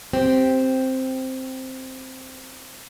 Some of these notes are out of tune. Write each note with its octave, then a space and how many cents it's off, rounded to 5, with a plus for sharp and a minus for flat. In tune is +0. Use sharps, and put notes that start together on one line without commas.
C4 +0 G4 -5